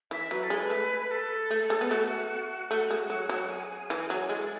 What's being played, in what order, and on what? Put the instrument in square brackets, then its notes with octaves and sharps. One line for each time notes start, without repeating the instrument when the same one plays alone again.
[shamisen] E3 [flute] E5
[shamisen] F#3 [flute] B4
[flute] A4
[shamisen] G#3
[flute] B4
[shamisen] A3
[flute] B4
A4
[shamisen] A3
G#3
B3
[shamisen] A3 [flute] F#4
[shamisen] A3 [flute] F#4
[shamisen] G#3
F#3
F#3
[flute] G#4
[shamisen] E3
F#3
[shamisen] G#3 [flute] A4